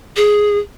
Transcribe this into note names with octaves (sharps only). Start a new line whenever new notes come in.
G#4